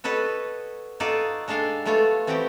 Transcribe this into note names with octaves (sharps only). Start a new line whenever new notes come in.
F#4 A4 B4 C#5 D#5
D#4 F4 F#4 A4 D5 D#5
G#3 D4 A4 F5 G5
G3 A3 B3 F4 A4 C#5
E3 C4 F#4 G4 B4 G5